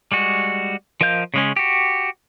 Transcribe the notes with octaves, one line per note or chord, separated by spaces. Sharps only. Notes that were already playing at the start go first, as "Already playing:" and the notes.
G3 G#3 F#4
F3 A#4 D#5 F5 G6
C#3 G#3 C#4
F#4 G4